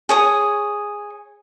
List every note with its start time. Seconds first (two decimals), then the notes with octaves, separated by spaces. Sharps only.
0.09 G#4 C#5 D#6